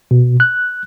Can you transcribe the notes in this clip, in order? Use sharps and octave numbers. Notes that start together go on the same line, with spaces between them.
B2
F#6